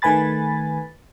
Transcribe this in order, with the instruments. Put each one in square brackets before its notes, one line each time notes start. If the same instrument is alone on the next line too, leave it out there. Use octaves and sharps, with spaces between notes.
[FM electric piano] D#3 A3 B4 G#5 B5 A6